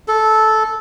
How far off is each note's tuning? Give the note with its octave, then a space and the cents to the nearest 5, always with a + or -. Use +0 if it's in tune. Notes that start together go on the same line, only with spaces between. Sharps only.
A4 -10